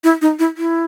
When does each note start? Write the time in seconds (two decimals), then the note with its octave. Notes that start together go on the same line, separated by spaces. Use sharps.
0.04 E4
0.22 D#4
0.39 E4
0.57 E4